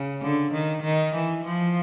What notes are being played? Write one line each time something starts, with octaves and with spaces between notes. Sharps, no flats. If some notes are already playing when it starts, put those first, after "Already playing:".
Already playing: C#3
D3
D#3
D#3
E3
F3